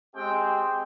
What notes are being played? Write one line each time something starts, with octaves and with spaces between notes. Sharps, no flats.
G#3 C4 G4 G5